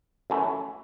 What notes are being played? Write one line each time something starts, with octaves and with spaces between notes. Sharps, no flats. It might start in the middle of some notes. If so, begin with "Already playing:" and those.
F#2 E3 A3